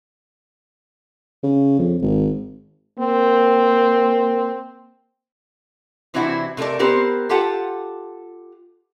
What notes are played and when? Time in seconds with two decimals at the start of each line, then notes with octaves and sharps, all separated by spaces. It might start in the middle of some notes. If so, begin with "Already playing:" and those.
1.43 C#3
1.79 F2
2.02 G#1
2.99 A#3 C4
6.14 C3 E3 C4 D4 E4 F#4
6.57 C3 A3 D4 A#4 D5
6.79 B3 C4 G4 A#4 C5
7.29 F4 G4 A4 F#5 G5